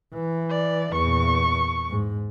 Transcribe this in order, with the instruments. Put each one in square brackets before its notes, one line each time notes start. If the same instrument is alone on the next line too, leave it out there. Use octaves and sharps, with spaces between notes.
[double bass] E3
[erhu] D5
[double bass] E2 A#2 [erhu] C#6
[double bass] G#2